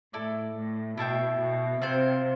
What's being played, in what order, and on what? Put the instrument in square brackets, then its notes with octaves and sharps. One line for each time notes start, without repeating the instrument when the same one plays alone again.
[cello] A2 [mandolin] E4 A4 D5
[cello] A2
[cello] B2 [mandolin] E4 A4 E5 G5
[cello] B2
[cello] C3 [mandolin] C4 F4 C5